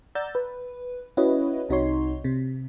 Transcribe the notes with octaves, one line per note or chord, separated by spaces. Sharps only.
D5 F#5 A#5 E6 G6 A6
B4
C#4 E4 F#4 B4 C#5 D#5
C2 C3 D#4 F#4 C#5 C6
C3